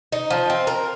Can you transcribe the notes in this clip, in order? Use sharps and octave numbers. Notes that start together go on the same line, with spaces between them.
D#4
F3
C4
A#4